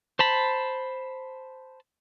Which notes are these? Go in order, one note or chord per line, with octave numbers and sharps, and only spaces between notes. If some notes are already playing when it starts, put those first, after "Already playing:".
C5 A5 B5